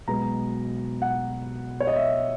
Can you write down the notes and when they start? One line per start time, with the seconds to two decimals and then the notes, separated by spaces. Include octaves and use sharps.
0.07 B1 B2 G#3 B3 A#5
1.02 F#5
1.80 C#5
1.87 D#5
1.96 E5